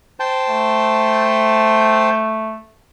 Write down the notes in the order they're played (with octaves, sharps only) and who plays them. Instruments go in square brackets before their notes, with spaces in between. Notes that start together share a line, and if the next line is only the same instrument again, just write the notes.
[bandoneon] C5 G5 A5
[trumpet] A3